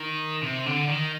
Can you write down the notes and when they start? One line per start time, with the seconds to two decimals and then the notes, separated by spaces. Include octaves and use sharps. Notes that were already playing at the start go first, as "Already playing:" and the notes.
Already playing: D#3
0.43 C3
0.66 D3
0.88 D#3